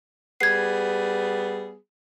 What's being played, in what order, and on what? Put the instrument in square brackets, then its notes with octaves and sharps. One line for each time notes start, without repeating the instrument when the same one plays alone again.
[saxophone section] G3 B3 G#4 [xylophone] G#6 C7